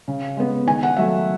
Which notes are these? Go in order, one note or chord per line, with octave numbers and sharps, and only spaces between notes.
C#3
G#3 B3
D#3 G#5
F#5
F#3 A3 E5